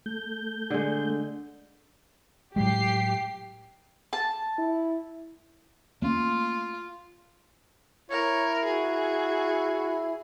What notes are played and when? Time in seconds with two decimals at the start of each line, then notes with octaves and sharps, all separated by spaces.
0.06 A3 G6
0.70 D3 G#3
2.56 A2 F#3 G#3 G4 C7
4.13 A5
4.59 E4
6.02 A3 A#3 C#4 F4
8.11 E4 A#4 C#5
8.65 F#4 G#4